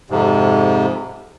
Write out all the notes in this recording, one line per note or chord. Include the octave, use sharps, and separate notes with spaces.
F2 G#2 C3